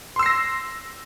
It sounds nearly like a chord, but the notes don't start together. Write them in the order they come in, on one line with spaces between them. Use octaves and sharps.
C6 E6 C7 A#6